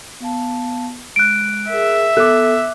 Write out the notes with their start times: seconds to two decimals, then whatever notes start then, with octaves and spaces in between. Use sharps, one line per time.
0.20 B3 F5 A5
1.16 G#3 F#6 D7
1.70 G#4 A#4 E5
2.17 B3 A4 D6 F#6